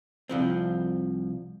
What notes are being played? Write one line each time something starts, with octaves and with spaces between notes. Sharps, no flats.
C2 F3 C4